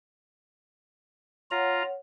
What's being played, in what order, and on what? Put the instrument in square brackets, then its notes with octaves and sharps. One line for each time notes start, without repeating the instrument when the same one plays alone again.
[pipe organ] F4 A#5 [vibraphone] C#5 F#5